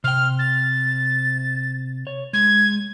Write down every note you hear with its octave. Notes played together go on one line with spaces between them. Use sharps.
C3 G5 F6
A6
C#5
G#3 G#6